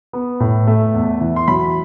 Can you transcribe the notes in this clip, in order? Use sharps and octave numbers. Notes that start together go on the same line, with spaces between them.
B3
A2
A3
E2
E3
C6
F#3 B5